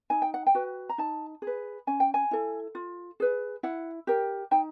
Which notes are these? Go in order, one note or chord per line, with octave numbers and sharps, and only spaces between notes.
D#4 G#5
G5
F#5
G5
F#4 B4
A#5
D#4 A5
G#4 B4
C#4 G#5
G5
G#5
E4 A4
F4
G#4 B4
E4 F#5
G4 A#4
D#4 G5